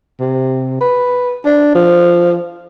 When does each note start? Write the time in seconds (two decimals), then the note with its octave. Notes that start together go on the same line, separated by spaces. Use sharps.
0.20 C3
0.81 B4
1.45 D4
1.75 F3